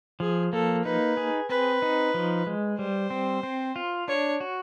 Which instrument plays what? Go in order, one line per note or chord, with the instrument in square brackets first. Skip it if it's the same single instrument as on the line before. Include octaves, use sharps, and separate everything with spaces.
[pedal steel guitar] F3 [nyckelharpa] G#4
[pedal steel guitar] A#3 [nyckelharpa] A4
[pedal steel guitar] D#4 [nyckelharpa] B4
[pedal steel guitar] G#4
[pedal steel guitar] C4 [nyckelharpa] B4
[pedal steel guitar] D#4
F3
G#3
[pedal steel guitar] G3 [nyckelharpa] C5
[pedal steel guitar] C4
C4
F4
[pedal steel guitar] D4 [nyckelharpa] C#5
[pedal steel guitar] F#4